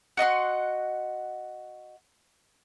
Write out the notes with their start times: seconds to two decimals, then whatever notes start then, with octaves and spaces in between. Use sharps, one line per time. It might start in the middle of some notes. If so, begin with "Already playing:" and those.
0.17 F#4 D#5 F#5 C6